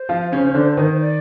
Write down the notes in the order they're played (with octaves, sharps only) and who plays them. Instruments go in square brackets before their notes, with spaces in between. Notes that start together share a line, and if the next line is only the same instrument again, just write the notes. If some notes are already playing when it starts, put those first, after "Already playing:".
Already playing: [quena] C5
[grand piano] F3 F4
C#3 C#4
C#4
D3 D4
D#3 D#4
[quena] D5